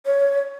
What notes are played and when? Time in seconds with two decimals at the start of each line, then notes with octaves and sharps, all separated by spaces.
0.06 C#5